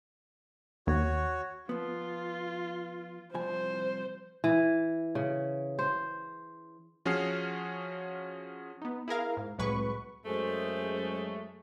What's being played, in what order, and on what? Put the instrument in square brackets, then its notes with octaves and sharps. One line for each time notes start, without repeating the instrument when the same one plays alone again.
[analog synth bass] D#2 [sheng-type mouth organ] F#4 C#5
[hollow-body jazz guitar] F3 B3 [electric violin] F4
[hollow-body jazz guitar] C2 F3 G#5 [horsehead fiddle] C5
[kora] E3
C#3
C5
[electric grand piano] F3 C#4 F#4 G#4 F6 C7
[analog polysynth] B3 D#4
E4 G#4 A#4 F5
G#2
C2 A2 F#3 G#3 B4 C#6
[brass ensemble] F#2 [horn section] G#3 A3 [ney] C5